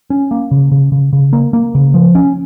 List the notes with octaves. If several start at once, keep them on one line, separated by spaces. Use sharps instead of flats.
C#4
A#3
C#3
C#3
C#3
C#3
A#3
A#3
C#3
F3
C#4